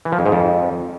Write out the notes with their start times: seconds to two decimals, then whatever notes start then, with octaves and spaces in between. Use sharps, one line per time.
0.05 E3
0.12 F3
0.19 F2
0.26 G#2
0.32 F2